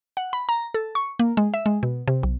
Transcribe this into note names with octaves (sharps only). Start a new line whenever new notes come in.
F#5
B5
A#5
A4
C#6
A#3
G#3
E5
G#3
B2
C3
B1